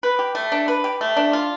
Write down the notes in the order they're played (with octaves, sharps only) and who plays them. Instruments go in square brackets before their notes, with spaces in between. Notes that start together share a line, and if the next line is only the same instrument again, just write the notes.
[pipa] B4
G4
A3
D4
B4
G4
A3
D4
F4